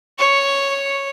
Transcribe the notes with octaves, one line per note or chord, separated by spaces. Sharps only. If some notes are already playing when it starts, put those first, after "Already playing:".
C#5 C#6